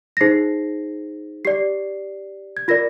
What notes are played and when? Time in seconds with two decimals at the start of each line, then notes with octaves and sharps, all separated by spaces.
0.17 A#6
0.21 D#4 G#4 C5 C7
1.45 G4 D5 C7
2.57 G#6
2.68 F4 A#4 D5 A#6